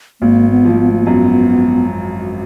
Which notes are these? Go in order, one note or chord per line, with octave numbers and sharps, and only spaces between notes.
G#1 A#3
B3
F3
A#3
B3
A3
A#3
F#2 B3